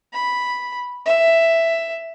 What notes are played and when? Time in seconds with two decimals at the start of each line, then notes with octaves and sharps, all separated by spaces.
0.13 B5
1.05 E5